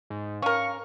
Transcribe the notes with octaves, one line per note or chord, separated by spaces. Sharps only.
G#2
C#4 A#4 F5 C#6